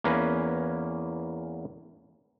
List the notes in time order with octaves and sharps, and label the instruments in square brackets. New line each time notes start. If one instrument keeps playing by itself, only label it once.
[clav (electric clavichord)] E2 A#3 C#4 B4